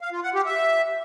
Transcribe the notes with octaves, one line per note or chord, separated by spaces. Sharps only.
F5
F4
F#5
G4
E5